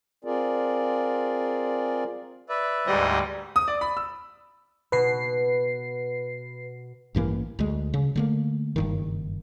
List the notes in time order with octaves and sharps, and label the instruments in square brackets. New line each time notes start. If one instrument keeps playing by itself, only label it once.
[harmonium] C4 F4 G#4 A#4 D5
[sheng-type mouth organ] B4 D5 E5
[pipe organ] D2 G#2 D#5 [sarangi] G3
[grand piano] D#6
D5
B5
E6
[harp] B2 [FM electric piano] B4 C7
[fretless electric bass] A1 G2 E3 A#3
D2 G#3
C#3
D3 A3 A#3
F#1 G2 D#3